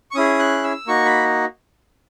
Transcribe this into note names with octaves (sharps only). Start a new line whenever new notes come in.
C#6
C#4 E4 G#4 D#6
F#6
E6
A#3 D#4 F#4 C#6
B5